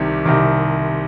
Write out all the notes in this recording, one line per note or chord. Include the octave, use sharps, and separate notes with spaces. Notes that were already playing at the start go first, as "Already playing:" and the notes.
Already playing: C2 C3 D#3
C2 C3 D#3